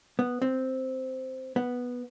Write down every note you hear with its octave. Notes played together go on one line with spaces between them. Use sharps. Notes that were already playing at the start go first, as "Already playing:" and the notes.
B3
C4
B3